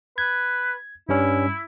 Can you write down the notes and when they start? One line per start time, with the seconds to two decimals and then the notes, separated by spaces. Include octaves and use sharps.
0.18 B4 G#6
1.09 G2 G3 C#4 E4